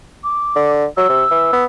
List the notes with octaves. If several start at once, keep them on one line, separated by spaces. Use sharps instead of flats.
D6
D3
F#3 E6
C3
E3
B3